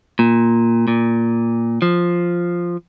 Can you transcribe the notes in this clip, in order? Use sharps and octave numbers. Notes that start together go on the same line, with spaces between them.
A#2
A#2
F3